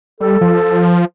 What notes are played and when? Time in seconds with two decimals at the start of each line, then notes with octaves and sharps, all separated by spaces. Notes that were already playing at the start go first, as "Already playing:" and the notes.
0.21 G3 A4
0.41 F3